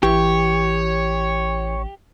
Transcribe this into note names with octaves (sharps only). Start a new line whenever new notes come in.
A1 E3 G4 C#5